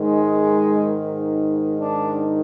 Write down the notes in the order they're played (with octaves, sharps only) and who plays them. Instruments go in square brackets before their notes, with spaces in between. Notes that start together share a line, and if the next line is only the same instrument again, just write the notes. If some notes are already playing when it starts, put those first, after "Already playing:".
Already playing: [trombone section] G#2 D#3 G#3
D4